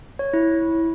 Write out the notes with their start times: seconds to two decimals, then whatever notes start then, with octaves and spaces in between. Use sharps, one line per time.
0.19 C#5
0.33 E4